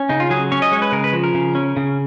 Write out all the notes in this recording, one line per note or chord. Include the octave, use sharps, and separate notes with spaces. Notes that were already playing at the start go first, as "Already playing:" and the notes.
Already playing: C#4
C#3 D#4
F4
F#3 G#4
C#4 C#5
D#5
G#3 C#5
B4
C#3 A#4
B4
F3
A#4
C#3
C#4
C#3